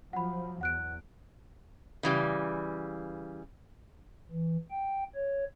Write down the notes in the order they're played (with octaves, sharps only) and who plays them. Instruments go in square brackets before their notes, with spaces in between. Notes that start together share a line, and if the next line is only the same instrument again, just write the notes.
[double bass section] F3 F#3 [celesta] F#5 B5
[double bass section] E2 [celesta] F#5 F#6 D7
[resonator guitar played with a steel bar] C#3 E3 G3
[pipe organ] E3
G5
C#5